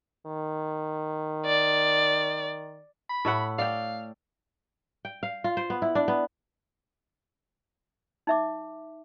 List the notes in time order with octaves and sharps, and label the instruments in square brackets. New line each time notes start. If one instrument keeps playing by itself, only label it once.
[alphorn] D#3
[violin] D5
[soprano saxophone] B5
[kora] A2 E5 F#5
[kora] D5 G5 [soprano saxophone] F5
[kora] G5
F5
F4
C5
B3
E4
D4
B3
[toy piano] D#4 E5 D6